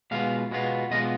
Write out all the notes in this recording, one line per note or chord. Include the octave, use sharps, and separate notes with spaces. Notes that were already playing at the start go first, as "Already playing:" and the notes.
B2 G#3 B3 F4 F5
B2 G#3 B3 F4
B2 G#3 B3 F4 D#5